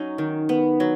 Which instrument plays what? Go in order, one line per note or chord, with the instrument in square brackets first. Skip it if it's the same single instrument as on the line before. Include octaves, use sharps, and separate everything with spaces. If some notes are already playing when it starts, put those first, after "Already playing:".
Already playing: [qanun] F#3 C#4 D#4
D#3
B3
F#3